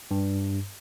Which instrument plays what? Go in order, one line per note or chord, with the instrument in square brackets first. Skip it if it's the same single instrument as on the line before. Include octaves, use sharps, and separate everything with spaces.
[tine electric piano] G2